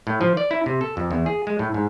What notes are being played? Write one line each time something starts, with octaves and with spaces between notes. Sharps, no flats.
A2
F3
D5
E4
C3
A4
F2
E2
G#4
G#3
A2
G#2